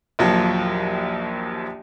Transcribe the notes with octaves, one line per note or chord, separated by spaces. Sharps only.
A#1 D#2 F3 F#3